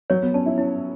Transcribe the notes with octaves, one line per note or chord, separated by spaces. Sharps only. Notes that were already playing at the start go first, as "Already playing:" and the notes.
F#3 C#5
B3
C#4 A5
E4
C#4 E4